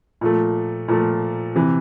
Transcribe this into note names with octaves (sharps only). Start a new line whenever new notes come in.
A#2 F3 A3
A#2 F3 A3
C3 E3